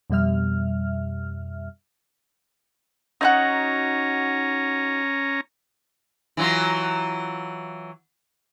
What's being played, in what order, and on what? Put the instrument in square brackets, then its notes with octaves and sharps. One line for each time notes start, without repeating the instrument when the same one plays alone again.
[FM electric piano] F2 B2 G3 E5 F6
[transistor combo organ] C#4 A#5 [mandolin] D#4 E4 F#4
[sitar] E3 F#3 F4